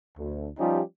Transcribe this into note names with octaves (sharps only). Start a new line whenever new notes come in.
D2
F3 G3 C#4 D#4 F4 G4